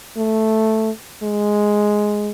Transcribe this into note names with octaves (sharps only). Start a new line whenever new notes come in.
A3
G#3